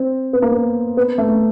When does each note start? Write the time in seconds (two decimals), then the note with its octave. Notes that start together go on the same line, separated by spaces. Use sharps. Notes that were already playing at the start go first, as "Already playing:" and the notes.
Already playing: C4
0.33 B3
0.42 A#3
0.51 B3
0.97 B3
1.18 A3